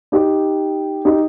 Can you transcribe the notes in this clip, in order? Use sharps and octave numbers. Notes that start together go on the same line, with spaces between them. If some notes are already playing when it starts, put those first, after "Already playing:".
D#4 G4
D#4 G4